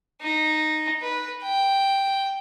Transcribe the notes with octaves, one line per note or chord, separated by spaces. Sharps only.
D#4
B4
G5